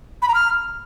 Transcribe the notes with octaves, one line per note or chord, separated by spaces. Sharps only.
B5
A#5
F6